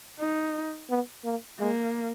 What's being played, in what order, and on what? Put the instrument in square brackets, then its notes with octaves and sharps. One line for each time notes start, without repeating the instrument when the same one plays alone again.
[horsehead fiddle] D#4
[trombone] B3
A#3
[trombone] G#3 [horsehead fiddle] A#3